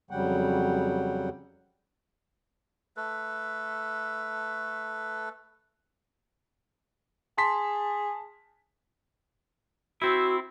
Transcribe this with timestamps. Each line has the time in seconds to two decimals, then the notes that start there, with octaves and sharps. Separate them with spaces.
0.11 F2 C#3 F#3 G3 F#5 G5
2.97 A3 A4 B4
7.38 G#4 A5 C6 B6
10.02 C4 E4 F#4